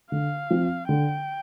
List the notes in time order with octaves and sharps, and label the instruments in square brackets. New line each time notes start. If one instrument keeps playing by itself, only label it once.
[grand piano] D3 [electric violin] F5
[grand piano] F3 C4
[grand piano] D3 [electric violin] G5